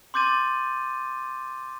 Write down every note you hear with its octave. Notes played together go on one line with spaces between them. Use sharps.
C6 D6 G6 A6 D#7